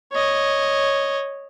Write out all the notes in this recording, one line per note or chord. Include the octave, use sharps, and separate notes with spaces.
C#5 D#5